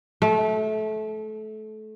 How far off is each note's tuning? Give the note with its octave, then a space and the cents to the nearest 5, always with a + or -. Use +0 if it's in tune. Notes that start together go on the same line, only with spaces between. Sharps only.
A3 -25